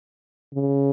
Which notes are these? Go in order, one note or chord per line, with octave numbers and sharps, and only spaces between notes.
C#3